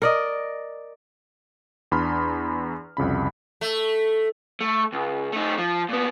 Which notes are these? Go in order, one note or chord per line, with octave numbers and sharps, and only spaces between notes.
A#4 D5 D#5
E2 D4 B5 C6 F6
C2 F2 C#3 B5
A3
A3
C#2
A3 D#4
F3
A#2 B3